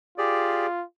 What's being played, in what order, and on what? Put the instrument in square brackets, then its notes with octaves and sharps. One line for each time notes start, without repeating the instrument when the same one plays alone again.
[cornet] F4 [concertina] G4 G#4 D5